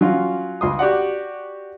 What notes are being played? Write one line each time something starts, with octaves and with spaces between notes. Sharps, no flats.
F#3 C#4 F4
C#2 C6 D#6
F#4 G4 D5 F#5